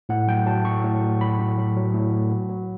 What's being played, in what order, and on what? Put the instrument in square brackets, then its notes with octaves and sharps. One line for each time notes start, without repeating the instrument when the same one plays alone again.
[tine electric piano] A2 F#5
F#3 G5
F#3 A5
A2 C#6
A2
F#3
F#3 B5
A2
F#3
F#3
A2
F#3
F#3
F#3